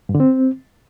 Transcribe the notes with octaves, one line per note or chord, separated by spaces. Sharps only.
G2
D3
C4